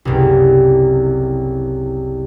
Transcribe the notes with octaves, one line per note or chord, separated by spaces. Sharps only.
F#1 C2